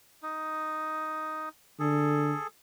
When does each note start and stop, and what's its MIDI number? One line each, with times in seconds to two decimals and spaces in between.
0.23 1.49 63
1.80 2.33 50
1.80 2.47 68
1.80 2.47 69